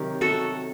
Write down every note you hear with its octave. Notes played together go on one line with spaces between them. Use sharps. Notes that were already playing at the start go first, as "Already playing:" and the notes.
Already playing: C3 D#3 F#3 G4 A#4
C3 F#4 A4